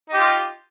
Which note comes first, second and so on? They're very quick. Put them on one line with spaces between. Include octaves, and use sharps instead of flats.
D#4 G4 F4